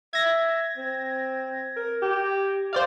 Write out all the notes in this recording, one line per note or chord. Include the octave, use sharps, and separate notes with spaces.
E5 G#6 A#6
C4
A#4
G4
C5 D5 F5